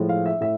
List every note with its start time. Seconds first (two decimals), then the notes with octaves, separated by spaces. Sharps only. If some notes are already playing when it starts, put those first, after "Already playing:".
Already playing: A2 F3 G#3
0.09 F5
0.26 E5
0.41 A2 E5